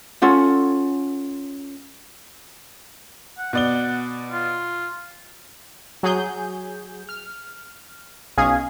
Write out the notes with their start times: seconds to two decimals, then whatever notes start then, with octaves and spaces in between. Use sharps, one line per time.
0.22 C#4 F4 A4 F#5
3.38 F#5
3.53 B2 D5 F#5 G7
4.32 F4
6.03 F#3 G#4 G6
7.09 F6
8.37 B1 C#4 G#4 D#5 F5 G#6